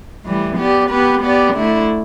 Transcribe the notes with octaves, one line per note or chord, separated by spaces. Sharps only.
A2 E3 G3
B3 G4 D5
B3 G4 B4
B3 G4 D5
D3 A3 E4